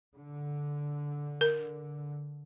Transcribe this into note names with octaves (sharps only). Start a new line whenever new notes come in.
D3
A#4